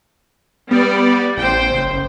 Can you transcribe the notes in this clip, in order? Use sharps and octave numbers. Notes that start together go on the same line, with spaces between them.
G3 B3 D5
A1 C5 G5
F#1